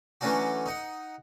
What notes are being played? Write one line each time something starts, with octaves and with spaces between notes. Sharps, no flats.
E3 F#3 A3 C#4 D4 F#4
D#4 F#5